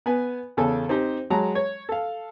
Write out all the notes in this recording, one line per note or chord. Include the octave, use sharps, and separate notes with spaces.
B3 B4 G#5
E2 C#3 A4 G#5
C4 D#4 G4 C5
F#3 G#3 A5 A#5
C#5
A4 F5